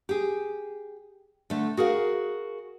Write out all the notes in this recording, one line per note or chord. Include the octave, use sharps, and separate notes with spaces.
G4 G#4
D3 A3
F#4 G#4 A#4 F5